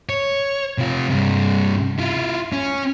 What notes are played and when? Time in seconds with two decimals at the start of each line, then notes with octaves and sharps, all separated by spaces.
0.09 C#5
0.78 C3 F4
1.10 G2 C3
1.99 E4 F4
2.53 C#4